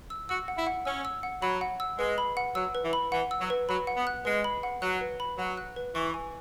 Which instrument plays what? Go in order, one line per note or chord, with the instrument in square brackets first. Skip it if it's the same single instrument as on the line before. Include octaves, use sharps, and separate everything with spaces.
[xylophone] E6
[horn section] F#4 [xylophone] E6
[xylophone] F#5
[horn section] E4
[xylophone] F#5
[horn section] C#4 [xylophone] E6
[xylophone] E6
F#5
[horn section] F#3 [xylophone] B5
[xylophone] F#5
E6
[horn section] G#3 [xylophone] B4
[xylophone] B5
F#5
[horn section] F#3 [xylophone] E6
[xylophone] B4
[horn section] E3
[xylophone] B5
[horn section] E3 [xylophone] F#5
[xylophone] E6
[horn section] F#3
[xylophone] B4
[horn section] F#3 [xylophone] B5
[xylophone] F#5
[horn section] B3
[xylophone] F#6
[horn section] G#3 [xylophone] B4
[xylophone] B5
F#5
[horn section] F#3 [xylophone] F#6
[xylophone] B4
B5
[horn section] F#3 [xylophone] F#5
[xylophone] F#6
B4
[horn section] E3 [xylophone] C#6
[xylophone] G#5